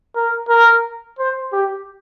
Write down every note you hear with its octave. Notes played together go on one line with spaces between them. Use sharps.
A#4
A#4
C5
G4